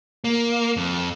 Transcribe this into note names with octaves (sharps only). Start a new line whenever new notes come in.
A#3
F2